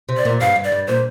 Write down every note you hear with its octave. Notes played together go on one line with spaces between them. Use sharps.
C3
D5
A#2
G2 F5
G2
D5
G2
A#2 C5